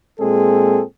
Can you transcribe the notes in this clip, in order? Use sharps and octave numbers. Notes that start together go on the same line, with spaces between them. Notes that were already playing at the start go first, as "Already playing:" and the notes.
A#2 G#3 C4 G#4 A4